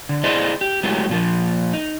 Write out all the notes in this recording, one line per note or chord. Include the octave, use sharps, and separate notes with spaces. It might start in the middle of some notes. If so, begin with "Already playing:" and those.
D3
E4 G#4 C5 D5 D#5
G4
F#3 G#3 A3 E4 F#4 G4
A#2 F3 A#3
D#4